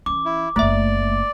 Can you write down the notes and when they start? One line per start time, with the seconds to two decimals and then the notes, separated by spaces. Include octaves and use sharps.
0.06 E3 C#4 D6
0.25 E4
0.56 F#1 A3 A#3 D5 E5